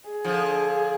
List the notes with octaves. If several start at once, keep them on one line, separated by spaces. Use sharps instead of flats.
G#4
D3 F3